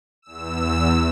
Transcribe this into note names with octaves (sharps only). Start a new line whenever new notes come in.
E2 E6